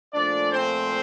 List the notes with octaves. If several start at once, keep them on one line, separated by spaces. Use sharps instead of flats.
A#2 F3 A3 D4 D5
C4 C5